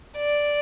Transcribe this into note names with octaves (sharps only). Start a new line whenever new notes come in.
D5